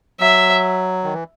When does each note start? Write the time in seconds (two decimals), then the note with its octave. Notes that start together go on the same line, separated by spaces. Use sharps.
0.20 F#3 E5
1.04 D#3
1.13 E3